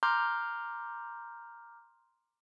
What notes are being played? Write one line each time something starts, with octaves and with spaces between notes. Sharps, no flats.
A#5 C6 D6 F6 G6